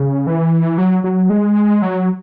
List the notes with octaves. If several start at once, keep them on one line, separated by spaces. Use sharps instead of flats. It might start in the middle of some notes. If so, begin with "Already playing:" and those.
Already playing: C#3
E3
F#3
F#3
G#3
F#3